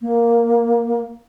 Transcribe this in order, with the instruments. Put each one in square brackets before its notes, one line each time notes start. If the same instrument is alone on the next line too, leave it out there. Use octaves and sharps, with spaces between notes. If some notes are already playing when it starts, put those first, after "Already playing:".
[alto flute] A#3